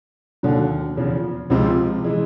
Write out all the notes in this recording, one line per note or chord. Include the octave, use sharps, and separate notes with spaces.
D#2 D3 F#3
E2 C#3 F3
C#2 C3 F3 G#3 C4
E3 G#3